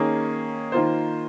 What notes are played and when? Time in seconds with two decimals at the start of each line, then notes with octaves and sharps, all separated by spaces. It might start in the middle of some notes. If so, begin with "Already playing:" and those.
Already playing: D#3 A#3 C#4 G#4
0.72 D#3 A#3 F4 C5